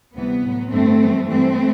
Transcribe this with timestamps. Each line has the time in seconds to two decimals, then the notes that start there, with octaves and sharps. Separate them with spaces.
0.15 D2 C3 E3 G3 B3
0.43 A2 F#3
0.72 G2 D3 G3 A3 C4
1.00 F#2 E3 G3
1.29 G2 E3 G3 A3 C4